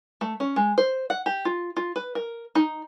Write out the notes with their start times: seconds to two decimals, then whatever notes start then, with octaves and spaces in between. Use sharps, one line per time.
0.21 A3
0.40 C#4
0.56 G#3
0.78 C5
1.10 F#5
1.26 G4
1.45 F4
1.77 F4
1.96 B4
2.15 A#4
2.55 D#4